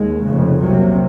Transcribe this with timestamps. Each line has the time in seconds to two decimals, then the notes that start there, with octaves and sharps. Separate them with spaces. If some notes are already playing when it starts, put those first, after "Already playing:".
Already playing: D#2 G#3
0.26 F1 F2 C#3
0.61 C2 C3 F#3 A#3